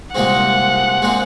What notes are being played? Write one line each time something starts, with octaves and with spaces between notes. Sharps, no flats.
C2 A#2 G#3 C4 F#5
A#2 G#3 C4